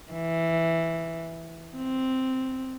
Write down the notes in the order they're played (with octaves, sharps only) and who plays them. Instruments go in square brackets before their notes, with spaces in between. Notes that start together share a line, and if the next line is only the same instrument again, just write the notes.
[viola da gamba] E3
C4